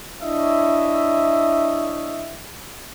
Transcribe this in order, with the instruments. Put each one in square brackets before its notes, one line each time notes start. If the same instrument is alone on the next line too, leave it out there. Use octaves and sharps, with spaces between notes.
[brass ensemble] D4 E4 C#5 D#5 E5